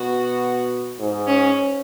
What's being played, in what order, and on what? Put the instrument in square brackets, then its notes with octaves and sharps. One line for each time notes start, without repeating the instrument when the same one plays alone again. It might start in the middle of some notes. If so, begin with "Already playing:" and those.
Already playing: [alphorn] B2 [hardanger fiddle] F#4
[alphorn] G#2
[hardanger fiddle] C#4